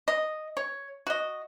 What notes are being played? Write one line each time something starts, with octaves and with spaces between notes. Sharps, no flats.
D#5
C#5
F#4 D#5